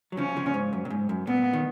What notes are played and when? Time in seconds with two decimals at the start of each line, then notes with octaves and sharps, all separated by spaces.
0.12 F#3
0.17 C#3 F3 C#4
0.36 C#3 F3
0.46 A#2
0.54 G#2
0.73 F#2
0.85 A#2
0.90 G#2
1.09 F#2
1.27 A#2 B3
1.53 D#3